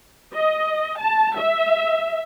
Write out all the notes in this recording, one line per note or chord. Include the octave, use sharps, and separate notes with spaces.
D#5
A5
E5